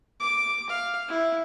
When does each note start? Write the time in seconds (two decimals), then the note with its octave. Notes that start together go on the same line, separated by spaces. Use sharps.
0.20 D6
0.70 F5
1.08 E4